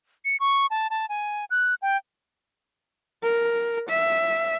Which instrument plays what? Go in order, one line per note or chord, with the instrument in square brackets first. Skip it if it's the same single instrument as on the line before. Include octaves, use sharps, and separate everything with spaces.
[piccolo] C#7
C#6
A5
A5
G#5
F#6
G5
[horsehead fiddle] A#4
E5